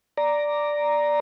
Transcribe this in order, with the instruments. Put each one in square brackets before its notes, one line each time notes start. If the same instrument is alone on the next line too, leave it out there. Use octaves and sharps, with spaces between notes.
[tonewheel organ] D5 A#5